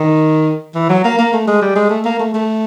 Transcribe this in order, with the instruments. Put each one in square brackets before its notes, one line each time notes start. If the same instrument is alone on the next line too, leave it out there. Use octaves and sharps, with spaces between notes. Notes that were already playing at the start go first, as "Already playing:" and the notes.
Already playing: [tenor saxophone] D#3
E3
F#3
A#3
A#3
A3
G#3
G3
G#3
A3
A#3
A3
A3